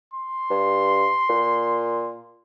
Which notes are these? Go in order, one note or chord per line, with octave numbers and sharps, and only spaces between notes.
C6
G2
A#2